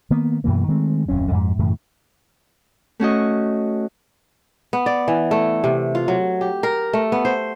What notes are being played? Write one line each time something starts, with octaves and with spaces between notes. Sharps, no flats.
D#3 A#3 B3
F#2 B2 E3 A#3
D#3 G#3 A3 C4
D1 F2 F#3 C#4
F2 G#2
F#2 A2 C#3 E3
A3 C#4 F#4 D#5
B3
D5
E3
A3
C3
F4
F#3
G4
A#4
A3
B3
C5